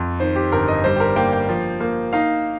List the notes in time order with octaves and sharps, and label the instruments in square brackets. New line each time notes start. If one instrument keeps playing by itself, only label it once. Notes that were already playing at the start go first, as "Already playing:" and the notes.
Already playing: [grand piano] F2
D#3 C5
G4
G1 A#4
D#5
G3 C5
G4
A#4
A#3 G5
G5
F3
A#3
D#4 F5